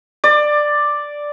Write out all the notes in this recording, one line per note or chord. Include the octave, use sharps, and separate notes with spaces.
D5